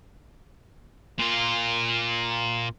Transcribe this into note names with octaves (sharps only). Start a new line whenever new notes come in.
A#2 F4